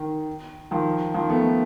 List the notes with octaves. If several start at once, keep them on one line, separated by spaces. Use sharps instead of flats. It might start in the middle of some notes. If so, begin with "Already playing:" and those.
Already playing: D#3
D#3 F3
D#3 F3
A3 B3